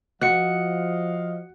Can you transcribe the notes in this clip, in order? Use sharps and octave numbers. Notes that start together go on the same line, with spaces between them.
F3 F#4 D#5 F5 F#6 C#7